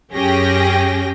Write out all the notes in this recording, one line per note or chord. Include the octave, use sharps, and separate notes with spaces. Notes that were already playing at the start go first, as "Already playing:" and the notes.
F#2 C#4 G4 G#4 G5 A#6